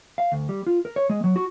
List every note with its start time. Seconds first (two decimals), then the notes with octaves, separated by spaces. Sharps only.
0.18 F5
0.32 D2
0.49 G3
0.67 F4
0.85 A#4
0.96 C#5
1.10 G#3
1.24 F#3
1.36 F#4